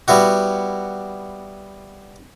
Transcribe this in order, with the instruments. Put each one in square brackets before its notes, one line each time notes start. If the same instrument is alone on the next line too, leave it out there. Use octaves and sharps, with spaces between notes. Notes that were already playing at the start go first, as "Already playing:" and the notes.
[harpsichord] G3 B3 E4 F#4